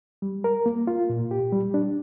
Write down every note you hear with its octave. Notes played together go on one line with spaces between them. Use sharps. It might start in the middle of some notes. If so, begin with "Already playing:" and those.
G3
A#4
A#3
F4
A#2
G4
G3
D4